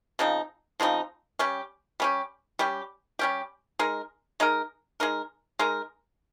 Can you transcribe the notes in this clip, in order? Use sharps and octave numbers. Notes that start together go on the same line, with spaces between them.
C#3 F3 C4 D#4
C#3 F3 C4 D#4
G3 C#4 G4
G3 C#4 G4
G3 C#4 G4
G3 C#4 G4
G#3 D#4 A#4
G#3 D#4 A#4
G#3 D#4 A#4
G#3 D#4 A#4